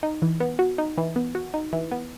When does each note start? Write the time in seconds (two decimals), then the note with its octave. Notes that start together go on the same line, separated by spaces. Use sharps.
0.03 D#4
0.22 E3
0.40 B3
0.59 F#4
0.78 D#4
0.98 E3
1.16 B3
1.35 F#4
1.54 D#4
1.73 E3
1.92 B3